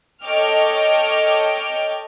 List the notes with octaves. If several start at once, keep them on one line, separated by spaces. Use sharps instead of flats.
A4 C#5 D#5 G5 D6 F6